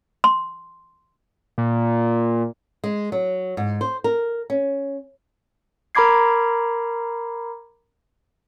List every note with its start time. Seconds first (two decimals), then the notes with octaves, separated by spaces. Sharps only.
0.24 C6
1.58 A#2
2.84 G#3
3.12 F#3
3.57 G#2
3.81 C5
4.04 A#4
4.50 C#4
5.95 A#4 A#5 B5 D6 G#6 C7